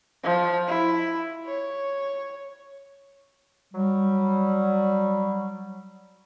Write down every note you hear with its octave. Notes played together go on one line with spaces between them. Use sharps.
F3
E4
C#5
F#3 G3